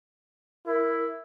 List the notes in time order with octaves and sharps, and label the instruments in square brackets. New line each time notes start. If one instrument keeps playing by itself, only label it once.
[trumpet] E4 [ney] A#4